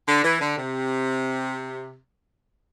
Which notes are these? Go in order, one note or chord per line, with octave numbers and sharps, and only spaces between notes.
D3
E3
D3
C3